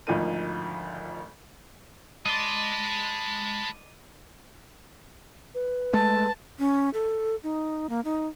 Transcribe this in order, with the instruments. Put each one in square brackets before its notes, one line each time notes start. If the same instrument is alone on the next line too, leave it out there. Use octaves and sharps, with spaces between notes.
[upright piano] G#1 D2 F3 D#4 A#4 D#7
[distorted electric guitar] G#3 C6 [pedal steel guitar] D5 D#5 [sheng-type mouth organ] A5 B5
[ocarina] B4
[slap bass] G#3 A3 [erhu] A5
[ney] C#4
A4
D#4
A#3
D#4